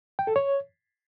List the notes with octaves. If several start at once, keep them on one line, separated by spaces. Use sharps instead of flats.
G5
A4
C#5